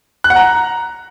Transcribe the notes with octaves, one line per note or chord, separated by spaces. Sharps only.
F#6
F#5
A#5